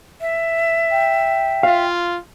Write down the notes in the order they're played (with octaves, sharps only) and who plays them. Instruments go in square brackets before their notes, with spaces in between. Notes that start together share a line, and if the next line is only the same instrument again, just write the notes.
[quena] E5
[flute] G5
[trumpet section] F4 [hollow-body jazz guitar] F5